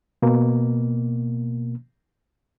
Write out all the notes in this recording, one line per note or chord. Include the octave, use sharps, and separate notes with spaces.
B2 A#3